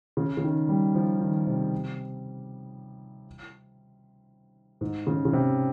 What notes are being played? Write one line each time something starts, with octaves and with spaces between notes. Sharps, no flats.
C#3
C#3
D#3
G3
F3
D#3
C3
G#2
C#3
C#3
C3